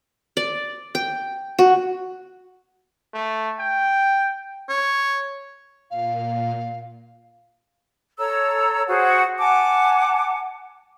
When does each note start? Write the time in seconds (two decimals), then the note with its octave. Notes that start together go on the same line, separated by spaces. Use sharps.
0.37 D5
0.95 G5
1.59 F#4
3.14 A3
3.60 G5
4.69 C#5
5.90 A#2 F5
8.18 A4 C#5 A#5 E6
8.87 F#4 G#4 C5 F#5
9.39 F#5 G#5 A5 D6